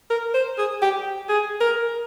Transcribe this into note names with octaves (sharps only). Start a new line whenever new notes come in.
A#4
C5
G#4
G4
G#4
A#4